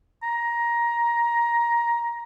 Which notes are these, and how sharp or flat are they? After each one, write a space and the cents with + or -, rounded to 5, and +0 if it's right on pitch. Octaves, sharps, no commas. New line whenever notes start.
A#5 +15